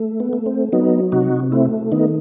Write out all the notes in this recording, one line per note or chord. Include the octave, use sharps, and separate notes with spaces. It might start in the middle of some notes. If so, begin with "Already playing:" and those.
Already playing: A3
B3
A3
C4
F#3 B3 D#4
C3 D#4 F#4
A3 C4 E4
D#3 B3 D#4